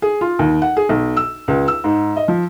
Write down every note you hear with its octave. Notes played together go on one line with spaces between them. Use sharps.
G#4
F4
D#2
F#5
G#4
B1
E6
C#2
E6
G#2
D#5
F3